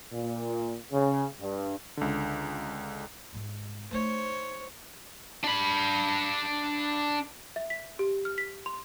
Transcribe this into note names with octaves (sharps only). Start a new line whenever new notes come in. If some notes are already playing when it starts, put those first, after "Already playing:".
A#2
C#3
G2
C#2 D3
G#2 G#3
A3 D#4 C5 C#5
D4 B5
E5
B6
G4
F6
B6
C6